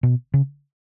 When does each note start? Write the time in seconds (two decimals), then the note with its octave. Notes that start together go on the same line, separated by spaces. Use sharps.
0.03 B2
0.34 C#3